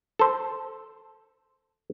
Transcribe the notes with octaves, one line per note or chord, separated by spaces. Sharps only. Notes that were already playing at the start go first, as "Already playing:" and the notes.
A4 C5